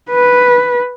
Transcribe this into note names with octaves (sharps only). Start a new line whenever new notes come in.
B4